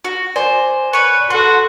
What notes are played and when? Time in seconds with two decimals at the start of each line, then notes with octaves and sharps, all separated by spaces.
0.05 F#4
0.36 C5 D5 G#5
0.93 B4 C#5 C#6
1.30 F#4 A4 F#5 C6